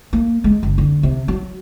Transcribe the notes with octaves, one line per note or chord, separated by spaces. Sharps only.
A#3
G#3
F#1
D3
C3
F#3